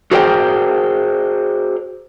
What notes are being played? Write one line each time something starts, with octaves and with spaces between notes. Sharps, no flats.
F#4 G#4 A#4 C5 D5 G5